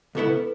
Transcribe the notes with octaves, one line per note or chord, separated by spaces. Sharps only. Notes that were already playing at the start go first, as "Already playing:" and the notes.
C#2 B2 B3 E4 A4
B4